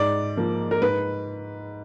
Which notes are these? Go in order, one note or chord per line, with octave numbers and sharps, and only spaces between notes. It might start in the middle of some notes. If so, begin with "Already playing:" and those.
Already playing: G#2 D5
F3 A#3
A#4
G#2 B4